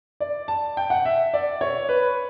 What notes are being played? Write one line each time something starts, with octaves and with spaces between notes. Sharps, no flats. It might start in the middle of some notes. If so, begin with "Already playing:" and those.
D5
A5
G5
F#5
E5
D5
C#5
B4